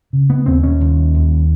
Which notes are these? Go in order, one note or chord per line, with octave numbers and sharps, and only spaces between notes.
C#3
B3
D#2 C4
C#4
D#2
D#2